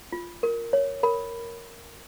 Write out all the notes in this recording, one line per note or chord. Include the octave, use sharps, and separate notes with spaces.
F4
A#4
C#5
A#4 B5